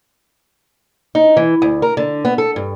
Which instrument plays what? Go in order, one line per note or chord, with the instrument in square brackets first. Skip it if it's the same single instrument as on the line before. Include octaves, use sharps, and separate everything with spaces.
[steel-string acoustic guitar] D#4
E3
D2
A#4
D3
B3
A4
G2